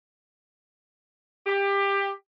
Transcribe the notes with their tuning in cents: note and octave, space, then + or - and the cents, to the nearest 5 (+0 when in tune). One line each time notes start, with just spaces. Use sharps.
G4 +20